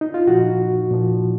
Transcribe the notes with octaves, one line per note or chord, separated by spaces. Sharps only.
D#4
F4
A#2 F3 D#4 F#4
A#2 F3